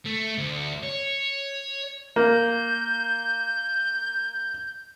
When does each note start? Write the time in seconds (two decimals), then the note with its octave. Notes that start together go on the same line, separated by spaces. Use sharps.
0.05 A3
0.38 D2
0.83 C#5
2.16 A#3 G6